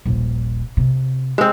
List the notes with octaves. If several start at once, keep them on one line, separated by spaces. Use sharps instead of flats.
D#1 A#1
C3
G#3 C4